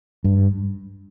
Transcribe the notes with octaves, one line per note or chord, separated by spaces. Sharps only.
G2